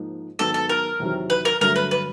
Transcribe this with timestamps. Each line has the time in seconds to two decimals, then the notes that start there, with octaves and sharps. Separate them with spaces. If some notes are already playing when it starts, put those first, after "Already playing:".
Already playing: G#2 F3 A#3 D#4
0.39 G#2 D#3 F#3 B3 A4
0.54 A4
0.69 A#4
1.00 E2 C3 D#3 F#3
1.30 B4
1.45 A#4
1.61 G2 D3 F#3 A3 A#4
1.76 B4
1.91 B4